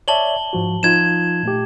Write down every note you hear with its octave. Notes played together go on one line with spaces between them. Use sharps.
C#5 D5 E5 A5 F#7 G7
G#2 F3 F#4
F3 D#4 F4 G#6 E7
A#2 A3 G4